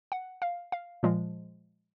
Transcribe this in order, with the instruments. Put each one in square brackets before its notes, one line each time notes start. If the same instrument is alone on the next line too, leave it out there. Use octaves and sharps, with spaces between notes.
[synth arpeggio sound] F#5
F5
F5
A#2 F3 G#3